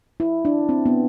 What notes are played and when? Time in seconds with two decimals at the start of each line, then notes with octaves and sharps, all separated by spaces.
0.20 E4
0.45 D4
0.69 C4
0.86 B3